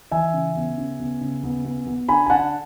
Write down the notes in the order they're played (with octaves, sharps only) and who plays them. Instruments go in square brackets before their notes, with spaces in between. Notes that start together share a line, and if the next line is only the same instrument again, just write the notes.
[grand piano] E3 E5 G#5
C#3
B3
C#3
B3
C#3
B3
B3
B3
D3 G#5 B5
G#5
D3 F#5 A5